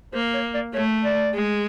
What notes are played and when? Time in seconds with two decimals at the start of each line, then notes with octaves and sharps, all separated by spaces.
0.13 A#3 C5
0.34 C#5
0.54 D5
0.74 A3 C#5
1.04 D5
1.34 G#3